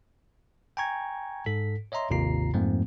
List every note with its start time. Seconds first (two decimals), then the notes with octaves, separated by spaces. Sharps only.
0.77 G5 G#5 A#5 C#6 G#6
1.46 G#2 A4 B6
1.92 C#5 D#5 E5 A#5 C6
2.10 G#1 D#2 C3 F4 A#5 C7
2.54 F2 G#2 F3 A3 A#3 C4